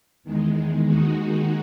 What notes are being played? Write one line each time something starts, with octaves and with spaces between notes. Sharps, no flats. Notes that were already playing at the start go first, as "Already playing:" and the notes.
E2 D#3 G#3
D#2 D#3 G#3 D#4 F#4